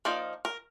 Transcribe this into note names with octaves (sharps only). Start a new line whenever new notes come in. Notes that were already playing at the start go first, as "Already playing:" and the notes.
F3 A#3 D#4 D5
A#4